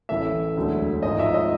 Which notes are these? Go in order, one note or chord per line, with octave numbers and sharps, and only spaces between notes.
A1 A2 E3 A3 E5
E1 D2 D3 F#3 A3
G#1 G#2 F3 D#5
E5
D#5